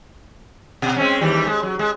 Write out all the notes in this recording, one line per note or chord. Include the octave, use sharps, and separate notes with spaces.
B2
G#3 C4 C#4
D#2 E3 G3
G#3
F#3
G#3